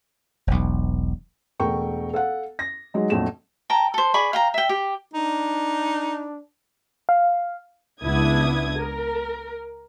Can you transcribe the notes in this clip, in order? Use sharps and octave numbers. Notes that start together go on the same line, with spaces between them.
E1 B1
E1 A3 A#4 G5 C#6
A4 F5 F#5
A#6
F#3 G#3 D#4
A#1 F2 F#3 A3 E7
G5 A5 A#5
A4 C5
G#4 D5 B5 C#6
F5 G5 A#5
E5 G5
G4
D4 D#4
F5
C#2 B3 D4 E4 D#6 G#6
A#4